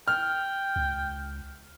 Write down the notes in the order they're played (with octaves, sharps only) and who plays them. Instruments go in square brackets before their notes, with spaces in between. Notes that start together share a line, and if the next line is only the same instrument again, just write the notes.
[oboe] G5 [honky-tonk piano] F6
[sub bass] C#2